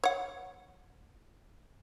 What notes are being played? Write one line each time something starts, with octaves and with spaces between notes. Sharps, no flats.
C#5 F#5